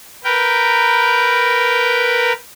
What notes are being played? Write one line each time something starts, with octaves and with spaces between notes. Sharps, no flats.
A#4 B4 G5